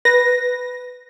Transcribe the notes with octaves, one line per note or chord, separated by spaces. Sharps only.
B4 A#6